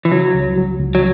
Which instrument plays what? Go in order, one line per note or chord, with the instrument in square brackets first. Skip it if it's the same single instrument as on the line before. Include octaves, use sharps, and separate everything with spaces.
[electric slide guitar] E3
[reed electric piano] C#3 [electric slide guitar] F#3
[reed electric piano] C#2
F#3
C#2
[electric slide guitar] F#3